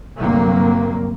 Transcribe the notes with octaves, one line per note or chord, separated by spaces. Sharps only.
D2 G2 C3 F#3 A#3